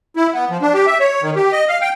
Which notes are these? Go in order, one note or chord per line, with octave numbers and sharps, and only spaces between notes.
E4
B3
F3
D4
G4
E5
C#5
D#3
G4
D#5
F5
G5